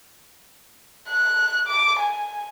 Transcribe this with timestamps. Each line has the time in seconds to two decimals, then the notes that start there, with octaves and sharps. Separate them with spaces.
1.09 F#6
1.68 D6
1.99 G#5